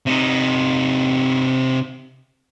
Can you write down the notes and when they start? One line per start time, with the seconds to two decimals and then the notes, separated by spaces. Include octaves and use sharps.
0.06 C3 D#4